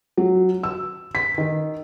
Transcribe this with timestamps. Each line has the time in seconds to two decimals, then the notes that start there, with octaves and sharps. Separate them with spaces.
0.17 F#3
0.63 E6
1.15 B6
1.38 D#3